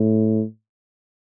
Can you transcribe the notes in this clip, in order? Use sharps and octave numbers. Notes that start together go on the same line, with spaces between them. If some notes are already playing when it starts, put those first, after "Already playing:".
Already playing: A2